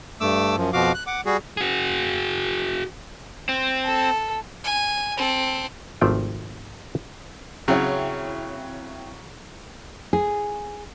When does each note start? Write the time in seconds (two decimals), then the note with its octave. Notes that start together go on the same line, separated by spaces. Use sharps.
0.21 G2 A3 D6 E6
0.57 F#2 F3
0.73 F2 B2 F3 F#4 F5 D6
0.94 F#6
1.07 F#5 D6
1.26 G3 F#4 G#4
1.57 F#4 G#4
3.49 C4
3.85 A4
4.64 G#5
5.17 C4 A4
6.01 G#1 C3 F3 A3 F4 G5
7.68 C#3 F#3 C4 E4 C#5
10.13 G#4